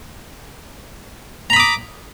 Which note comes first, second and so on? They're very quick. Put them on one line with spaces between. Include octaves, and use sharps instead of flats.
A#5 B5 D#6 D6